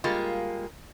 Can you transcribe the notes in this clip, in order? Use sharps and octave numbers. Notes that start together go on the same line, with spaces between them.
G3 G#3 A#3 F4